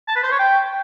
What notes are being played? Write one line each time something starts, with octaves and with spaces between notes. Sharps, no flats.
A5
B4
C5
C#5
G5